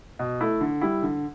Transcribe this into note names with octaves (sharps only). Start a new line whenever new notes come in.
B2
A3 E4
D3
G3 E4
D3